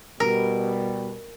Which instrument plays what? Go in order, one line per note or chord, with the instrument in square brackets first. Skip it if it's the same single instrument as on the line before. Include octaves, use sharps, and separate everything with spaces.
[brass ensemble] B2 G3 [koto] A#4